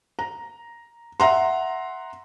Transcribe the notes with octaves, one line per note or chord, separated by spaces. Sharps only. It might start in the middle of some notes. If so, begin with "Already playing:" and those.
A#5
E5 F#5 A#5 C6